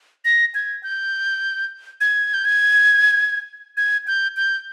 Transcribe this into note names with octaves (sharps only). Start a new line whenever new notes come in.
A#6
G#6
G6
G#6
G6
G#6
G#6
G6
G6